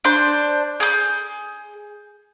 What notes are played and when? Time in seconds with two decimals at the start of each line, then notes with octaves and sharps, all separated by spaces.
0.04 D4 C5
0.80 G#4 G6